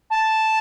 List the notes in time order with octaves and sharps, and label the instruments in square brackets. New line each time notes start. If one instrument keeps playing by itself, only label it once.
[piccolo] A5